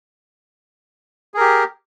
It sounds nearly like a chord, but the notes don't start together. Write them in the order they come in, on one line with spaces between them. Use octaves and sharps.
G#4 A#4 G4